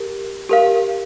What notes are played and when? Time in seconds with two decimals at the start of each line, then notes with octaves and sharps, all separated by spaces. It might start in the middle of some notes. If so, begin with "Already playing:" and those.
Already playing: G4 A#4
0.49 G4 A#4 F5